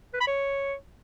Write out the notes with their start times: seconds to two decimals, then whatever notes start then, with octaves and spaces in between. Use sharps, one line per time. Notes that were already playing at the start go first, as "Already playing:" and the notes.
0.14 B4
0.21 B5
0.27 C#5